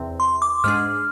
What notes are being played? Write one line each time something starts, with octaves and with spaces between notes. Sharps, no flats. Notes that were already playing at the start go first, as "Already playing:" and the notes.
Already playing: E2 C3 C4
C6
D6
G#2 G#3 D4 G#4 F6